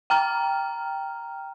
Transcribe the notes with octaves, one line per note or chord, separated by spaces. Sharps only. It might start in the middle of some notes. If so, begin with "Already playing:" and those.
G5 A#5 F6